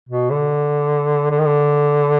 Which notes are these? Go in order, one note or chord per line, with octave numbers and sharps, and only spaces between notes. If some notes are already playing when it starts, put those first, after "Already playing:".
B2
D3
D3
D#3
D3